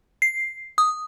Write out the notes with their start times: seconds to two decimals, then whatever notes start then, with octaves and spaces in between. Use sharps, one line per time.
0.22 C7
0.78 D#6